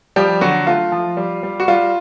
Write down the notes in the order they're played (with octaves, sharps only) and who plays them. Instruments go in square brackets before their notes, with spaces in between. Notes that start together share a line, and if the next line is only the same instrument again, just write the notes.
[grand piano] F3 G3 G4
D3 F#3 F#4
A3 F4
F3
G3
G3
F#4
G3 F4